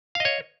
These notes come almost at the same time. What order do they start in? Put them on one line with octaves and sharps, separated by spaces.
F5 D#5 C#5